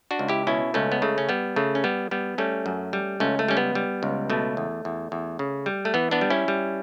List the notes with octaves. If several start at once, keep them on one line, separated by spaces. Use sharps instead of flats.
D4 F#4
C#2
E4 G4
B2 C#4 E4
C#2 A3 C#4
B3
C#3 A3
C#4
G3 B3
C#3 A3
C#4
G3 B3
G3 B3
G3 A3 C#4
F#2
G3
C#2 A3 C#4
A3
G3 C#4
B3
G3
C#2
B2 A3
E2
E2
E2
C#3
G3
A3
E3 B3
B3 D4
G3
C#4 E4
G3